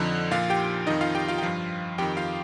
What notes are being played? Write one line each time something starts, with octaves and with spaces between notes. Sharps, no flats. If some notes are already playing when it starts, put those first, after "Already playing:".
Already playing: F2 D3 F3 D#4
A#2 F3 F4 F5
G4 G5
F2 D#3 D#4 D#5
F4 F5
G4 G5
F4 F5
G5
G2 F3 F4 F5
F2 D#3 G4 G5
F4 F5